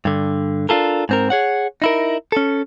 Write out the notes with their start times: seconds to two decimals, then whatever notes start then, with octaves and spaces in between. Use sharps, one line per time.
0.05 G2 D3
0.69 D4 D#4 F4 A4 A#4
1.09 G#2 C4 A#4
1.30 G#4 C#5 F#5
1.82 D#4 E4 A#4
2.32 C#4 A4